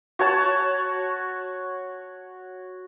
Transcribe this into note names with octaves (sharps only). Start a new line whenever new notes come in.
F#4 C#5 A5